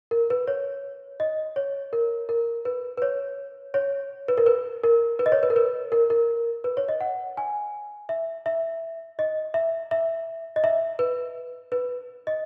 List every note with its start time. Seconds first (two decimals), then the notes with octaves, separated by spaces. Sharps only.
0.11 A#4
0.30 B4
0.47 C#5
1.20 D#5
1.56 C#5
1.93 A#4
2.29 A#4
2.65 B4
2.97 B4
3.02 C#5
3.74 C#5
4.28 B4
4.38 A#4
4.46 B4
4.84 A#4
5.19 B4
5.26 D#5
5.32 C#5
5.43 B4
5.50 A#4
5.56 B4
5.92 A#4
6.10 A#4
6.64 B4
6.77 C#5
6.88 D#5
7.01 F#5
7.37 G#5
8.09 E5
8.46 E5
9.19 D#5
9.54 E5
9.91 E5
10.56 D#5
10.64 E5
10.99 B4
11.72 B4
12.27 D#5